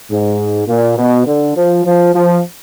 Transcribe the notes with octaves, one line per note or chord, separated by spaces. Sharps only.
G#2
A#2
B2
D3
F3
F3
F3